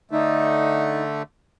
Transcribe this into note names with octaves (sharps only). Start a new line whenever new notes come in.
D3 A3 D#4